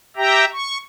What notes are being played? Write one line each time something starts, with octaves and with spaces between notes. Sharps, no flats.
G4 E5 G5 A#5
C#6